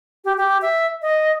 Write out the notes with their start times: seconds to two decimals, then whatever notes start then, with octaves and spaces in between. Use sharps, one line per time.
0.25 G4
0.37 G4
0.62 E5
1.02 D#5